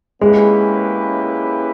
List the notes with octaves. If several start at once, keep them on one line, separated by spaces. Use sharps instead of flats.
G#3 A#3 C#4 E4 G4 B4